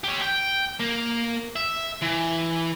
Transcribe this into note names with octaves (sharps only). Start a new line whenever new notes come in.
G4 C#5
G5
A#3
E5
E3